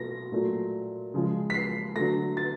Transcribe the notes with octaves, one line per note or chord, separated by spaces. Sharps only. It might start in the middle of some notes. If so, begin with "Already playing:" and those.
Already playing: B2 F#3 A3 A#6
A#2 F#3 A3
C#3 F3 G#3
B6
C7
D3 F#3 A3 A#6
A6